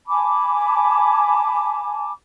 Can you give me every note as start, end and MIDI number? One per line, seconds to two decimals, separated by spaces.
0.06 2.12 80
0.06 2.12 81
0.06 2.12 83
0.06 2.12 86